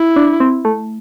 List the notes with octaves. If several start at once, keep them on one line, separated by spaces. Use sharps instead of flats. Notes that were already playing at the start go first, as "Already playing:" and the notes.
Already playing: E4
D4
C4
A3